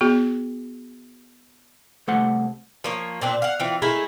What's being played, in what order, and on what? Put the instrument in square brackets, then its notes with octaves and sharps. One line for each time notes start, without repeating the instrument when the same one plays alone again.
[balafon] B3 F#4 G#4
[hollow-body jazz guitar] C2 A3 A4 C5 F#5 C6
[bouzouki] F3 A#3 C#5
A#2 C4 D4
F5 F#5
E3 C4 F4
G#3 A3 E4 A#4